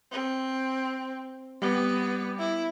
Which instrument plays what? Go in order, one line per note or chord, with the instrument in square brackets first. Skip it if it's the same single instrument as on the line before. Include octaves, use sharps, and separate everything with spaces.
[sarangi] C4
[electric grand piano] G3 G4 [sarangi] B3
[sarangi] E4